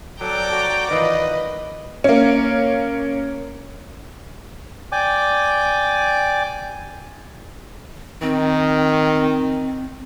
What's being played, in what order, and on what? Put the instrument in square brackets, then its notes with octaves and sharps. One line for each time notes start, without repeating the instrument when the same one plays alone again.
[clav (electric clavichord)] F#3 [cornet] A4 [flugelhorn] D5 [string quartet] G5 A#5 D6
[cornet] F#4
[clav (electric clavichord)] D#3 E3 F4 [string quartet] B4 [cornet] D#5
[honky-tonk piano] A#3 C#4
[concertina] D5 G5 G#5 D6
[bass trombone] D#3 [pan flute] C4